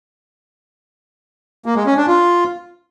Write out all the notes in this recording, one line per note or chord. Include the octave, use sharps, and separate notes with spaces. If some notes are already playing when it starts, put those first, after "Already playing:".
A#3
G#3
C#4
D4
F4